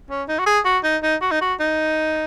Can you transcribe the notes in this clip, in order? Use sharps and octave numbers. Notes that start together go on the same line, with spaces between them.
C#4
D#4
F#4
G#4
F#4
D#4
D#4
F#4
D#4
F#4
D#4